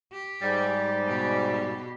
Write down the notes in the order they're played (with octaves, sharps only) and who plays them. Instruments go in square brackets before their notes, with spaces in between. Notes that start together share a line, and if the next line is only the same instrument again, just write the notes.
[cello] G4
[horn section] G#2 G3
[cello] B2 G4